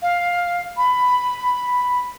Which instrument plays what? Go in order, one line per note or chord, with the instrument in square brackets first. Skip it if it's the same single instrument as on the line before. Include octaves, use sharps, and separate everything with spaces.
[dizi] F5
B5